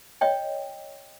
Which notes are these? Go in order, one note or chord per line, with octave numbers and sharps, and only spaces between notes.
C#5 D#5 G5